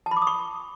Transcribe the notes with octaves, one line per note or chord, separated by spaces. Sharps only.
A5
B5
D6
D#6
C#6